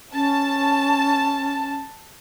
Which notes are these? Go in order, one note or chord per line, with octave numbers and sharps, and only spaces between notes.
C#4 A5